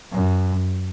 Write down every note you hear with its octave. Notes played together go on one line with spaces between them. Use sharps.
F#2